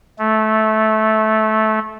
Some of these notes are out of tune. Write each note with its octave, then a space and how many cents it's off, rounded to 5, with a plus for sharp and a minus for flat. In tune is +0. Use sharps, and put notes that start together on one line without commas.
A3 -15